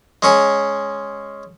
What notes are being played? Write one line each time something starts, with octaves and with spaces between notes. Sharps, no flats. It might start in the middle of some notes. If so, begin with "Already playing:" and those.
G#3 C#4 G#4